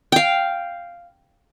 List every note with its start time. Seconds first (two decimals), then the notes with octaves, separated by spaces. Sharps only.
0.12 F5 G5